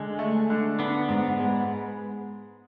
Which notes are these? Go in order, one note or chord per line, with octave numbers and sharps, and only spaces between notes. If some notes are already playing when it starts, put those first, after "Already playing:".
Already playing: D3 G#3
A3
D3
B3 D4
G#2
G#3